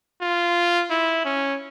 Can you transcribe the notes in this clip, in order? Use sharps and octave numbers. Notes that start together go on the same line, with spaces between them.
F4
E4
C#4